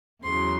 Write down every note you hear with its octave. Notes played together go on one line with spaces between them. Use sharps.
E2 C#3 F#3 C6